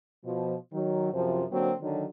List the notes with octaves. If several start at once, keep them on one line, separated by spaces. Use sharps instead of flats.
B2 F3
D#3 F#3
F#2 C3 F3
D3 F#3 A#3 C4
D3 D#3 F#3